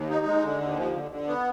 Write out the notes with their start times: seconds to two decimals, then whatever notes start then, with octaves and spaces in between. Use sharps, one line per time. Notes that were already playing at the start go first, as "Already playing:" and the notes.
Already playing: D#2
0.10 D#4
0.26 G#3
0.44 D3
0.61 D#2
0.76 F3
0.94 D3
1.11 D3
1.27 B3